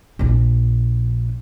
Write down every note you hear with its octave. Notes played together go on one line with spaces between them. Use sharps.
A#1 D4